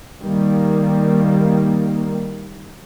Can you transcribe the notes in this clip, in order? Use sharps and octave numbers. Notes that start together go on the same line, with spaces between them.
D#3 G3 A#3